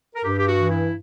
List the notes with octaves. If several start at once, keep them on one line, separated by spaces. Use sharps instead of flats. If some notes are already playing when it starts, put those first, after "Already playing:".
A#4
G2 G4
G4
F#4
E3
E4